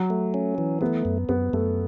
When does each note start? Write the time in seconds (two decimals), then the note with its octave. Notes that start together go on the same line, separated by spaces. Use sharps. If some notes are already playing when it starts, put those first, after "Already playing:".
Already playing: F#3
0.10 A3
0.34 C#4
0.58 E3
0.81 A3 B3
1.05 F#2
1.29 F#2 B3
1.53 F#2 A3